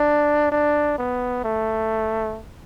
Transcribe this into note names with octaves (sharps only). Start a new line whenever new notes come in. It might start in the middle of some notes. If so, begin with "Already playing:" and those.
Already playing: D4
D4
B3
A3